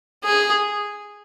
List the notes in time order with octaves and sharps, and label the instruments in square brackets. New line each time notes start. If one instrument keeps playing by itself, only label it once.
[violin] G#4